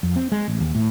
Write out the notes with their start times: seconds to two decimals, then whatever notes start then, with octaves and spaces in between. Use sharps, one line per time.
0.03 F2
0.16 C4
0.32 G#3
0.48 A1
0.60 D#2
0.75 A2